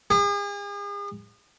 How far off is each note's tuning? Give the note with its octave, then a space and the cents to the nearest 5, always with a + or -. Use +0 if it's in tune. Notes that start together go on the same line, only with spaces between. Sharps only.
G#4 -40